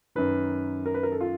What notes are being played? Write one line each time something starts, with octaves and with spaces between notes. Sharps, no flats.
F#2 D#3 B4
A#4
B4
A#4
A4
F4